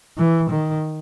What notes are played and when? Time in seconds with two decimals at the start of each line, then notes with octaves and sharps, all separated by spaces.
0.17 E3
0.51 D#3